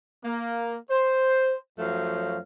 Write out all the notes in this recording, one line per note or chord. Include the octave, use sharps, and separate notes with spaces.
A#3
C5
F#2 F3 F#3 A3 F5